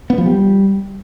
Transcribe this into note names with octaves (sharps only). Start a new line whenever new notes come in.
B3
F3
G3